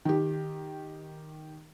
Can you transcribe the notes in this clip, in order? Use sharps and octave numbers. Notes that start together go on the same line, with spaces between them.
D#3 G4